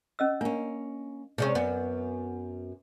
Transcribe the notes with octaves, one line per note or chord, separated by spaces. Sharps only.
C#4 D#5 E6
A#3 C#4 D4
C3 G#3 C#4 D5
F#2 B3